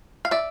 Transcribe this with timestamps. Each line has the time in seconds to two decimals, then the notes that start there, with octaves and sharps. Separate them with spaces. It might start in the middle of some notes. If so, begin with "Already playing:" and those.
0.25 F5
0.31 D5 E5